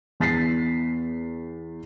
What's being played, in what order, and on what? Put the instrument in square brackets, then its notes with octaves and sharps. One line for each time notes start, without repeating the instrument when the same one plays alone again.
[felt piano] E2 A6 B6 C7